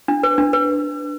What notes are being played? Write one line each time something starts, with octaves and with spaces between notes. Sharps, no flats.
D4
B4
D4
B4